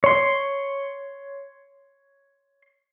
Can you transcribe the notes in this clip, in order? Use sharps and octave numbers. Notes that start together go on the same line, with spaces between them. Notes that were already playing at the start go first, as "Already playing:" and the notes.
C#5 C6